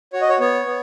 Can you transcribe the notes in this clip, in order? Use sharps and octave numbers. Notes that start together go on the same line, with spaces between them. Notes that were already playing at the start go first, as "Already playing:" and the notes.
F#4 C#5
D#5
C#5
B3 C#5
B3